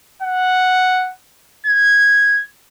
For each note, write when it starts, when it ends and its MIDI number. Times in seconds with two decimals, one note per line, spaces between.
0.22 1.12 78
1.66 2.44 92